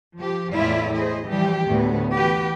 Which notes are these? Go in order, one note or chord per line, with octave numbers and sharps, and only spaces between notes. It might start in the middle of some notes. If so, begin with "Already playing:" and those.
F3 G4
E2 A2 E4 F4 D5 E5
E4 G#4 C5 D#5
E3 F3 G3 G4
D2 A2 A3 B3
E3 F#4 G4 B4